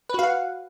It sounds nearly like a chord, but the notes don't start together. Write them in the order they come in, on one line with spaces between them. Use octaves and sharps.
B4 F#4 F5 F#5